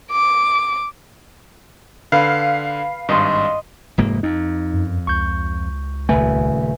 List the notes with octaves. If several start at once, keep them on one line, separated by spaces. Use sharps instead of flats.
D6
D3 B4 F5
G#1 G2 D#5 C6
F1 G#2 A#3
F2 D#4
F#2
C#2 C#6 G6
D#1 C#3 A3 B4 E5 G#5